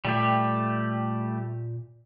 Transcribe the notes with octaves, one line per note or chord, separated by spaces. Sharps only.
A#2 G3 A3 G4